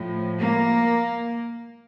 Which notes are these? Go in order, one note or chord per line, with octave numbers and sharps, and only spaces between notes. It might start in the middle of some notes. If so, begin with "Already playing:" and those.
Already playing: A2 F3
A#3